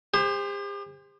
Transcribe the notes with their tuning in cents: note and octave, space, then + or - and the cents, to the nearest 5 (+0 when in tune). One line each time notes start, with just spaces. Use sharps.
G4 +45 C5 +0